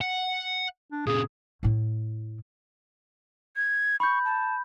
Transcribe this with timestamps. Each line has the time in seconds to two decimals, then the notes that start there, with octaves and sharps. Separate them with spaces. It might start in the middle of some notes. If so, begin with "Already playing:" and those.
0.01 F#5
0.92 D4
1.07 A#2 C#3 G#4
1.63 A2 E4
3.56 G#6
4.00 B5 C#6 G6
4.25 A5